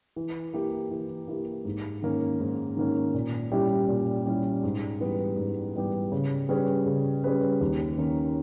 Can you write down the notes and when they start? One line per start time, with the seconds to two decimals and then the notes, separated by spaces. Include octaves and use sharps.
0.16 E3
0.53 A#3 E4 G4
0.91 E3
1.28 A#3 E4 G4
1.65 G#2
2.02 D#3 A#3 C#4
2.40 G#2
2.77 D#3 A#3 C#4
3.14 A#2
3.52 G3 C#4 E4 G4
3.88 A#2
4.26 G3 C#4 E4 G4
4.63 G#2
5.00 E3 G3 B3 G4
5.37 G#2
5.75 E3 G3 B3 G4
6.12 C#3
6.49 G3 C#4 G#4 B4
6.86 C#3
7.24 G3 C#4 G#4 B4
7.61 D#2
7.98 D#3 A#3 C#4